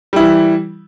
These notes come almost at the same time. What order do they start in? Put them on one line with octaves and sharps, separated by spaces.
G3 E4 E3